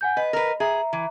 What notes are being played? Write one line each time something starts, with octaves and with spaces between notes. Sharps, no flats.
F#5 G#5 G6
B4 D#5
A#4 B4
G#4 E5 A#5
E3